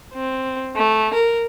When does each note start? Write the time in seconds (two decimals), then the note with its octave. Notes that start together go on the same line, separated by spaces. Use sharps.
0.13 C4
0.76 A3
1.13 A#4